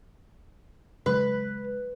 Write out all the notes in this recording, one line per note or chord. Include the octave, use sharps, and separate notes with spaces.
C#3 F#3 G#3 B4